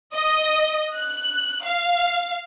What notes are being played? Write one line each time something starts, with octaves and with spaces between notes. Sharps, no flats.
D#5
F#6
F5